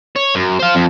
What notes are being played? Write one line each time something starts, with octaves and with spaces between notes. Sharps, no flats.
C#5
F#2
C5 F5
F2